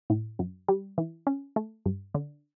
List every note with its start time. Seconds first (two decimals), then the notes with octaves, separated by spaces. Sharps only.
0.10 A2
0.39 F#2
0.68 G3
0.98 E3
1.27 C#4
1.56 A3
1.85 G2
2.14 D3